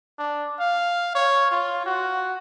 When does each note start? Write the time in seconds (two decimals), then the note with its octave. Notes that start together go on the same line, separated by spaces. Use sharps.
0.19 D4
0.59 F5
1.15 C#5
1.51 F4
1.86 F#4